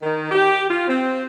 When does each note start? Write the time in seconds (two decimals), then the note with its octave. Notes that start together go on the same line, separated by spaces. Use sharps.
0.02 D#3
0.31 G4
0.70 F4
0.87 C4